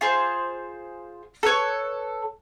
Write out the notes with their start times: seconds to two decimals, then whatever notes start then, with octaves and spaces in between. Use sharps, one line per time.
0.01 F4 G#4 C5
1.43 A4 B4 C#5